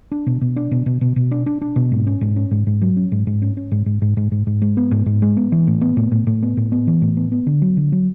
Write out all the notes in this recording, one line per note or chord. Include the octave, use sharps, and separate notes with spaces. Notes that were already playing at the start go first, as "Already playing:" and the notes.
D4
B2
B2
D4
B2
B2
B2
B2
D4
D4
D4
B2
G#2
C#4
G#2
C#4
G#2
G#2
F#3
C#4
G#2
G#2
C#4
C#4
G#2
G#2
G#2
G#2
G#2
G#2
G#3
B3
G#2
G#2
G#3
B3
E3
A2
B3
A2
A2
A2
B3
A2
B3
E3
A2
B3
B3
D3
F#3
D3
F#3